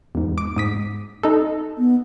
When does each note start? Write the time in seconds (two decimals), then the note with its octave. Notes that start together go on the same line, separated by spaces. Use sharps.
0.15 E2 G#2
0.38 D6
0.56 G#2 D#6 B6
1.23 D#4 A4
1.78 B3